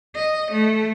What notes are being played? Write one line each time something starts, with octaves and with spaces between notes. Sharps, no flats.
D#5
A3